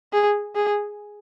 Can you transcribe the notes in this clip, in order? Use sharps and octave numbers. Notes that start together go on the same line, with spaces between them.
G#4
G#4